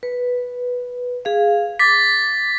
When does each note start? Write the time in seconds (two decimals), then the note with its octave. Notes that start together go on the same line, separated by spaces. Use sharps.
0.03 B4
1.25 G#4 F5
1.79 D6 A6 B6